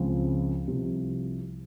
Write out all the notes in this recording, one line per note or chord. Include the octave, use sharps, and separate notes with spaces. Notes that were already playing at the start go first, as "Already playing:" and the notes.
Already playing: C#2 C#3 F3 C4
C2 C3 F3